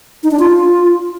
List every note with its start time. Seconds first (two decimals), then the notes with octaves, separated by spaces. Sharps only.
0.23 D#4
0.31 D4
0.39 F4